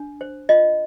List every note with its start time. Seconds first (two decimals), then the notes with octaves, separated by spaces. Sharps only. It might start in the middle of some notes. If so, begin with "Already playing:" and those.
Already playing: D4
0.21 C5
0.49 F4 D#5